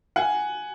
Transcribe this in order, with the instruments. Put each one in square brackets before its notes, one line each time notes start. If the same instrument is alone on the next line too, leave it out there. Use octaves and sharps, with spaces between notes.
[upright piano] F#5 G#5